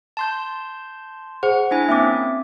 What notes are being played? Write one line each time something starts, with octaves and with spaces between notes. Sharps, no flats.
A5 C6 G6
G#4 C5 F#5
D4 E4 G#5
A#3 C4 C#4 E5 D6